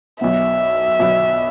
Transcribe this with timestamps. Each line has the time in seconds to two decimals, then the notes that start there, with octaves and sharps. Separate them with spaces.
0.21 B1 B2 B3 E5
0.99 B1 B2 B3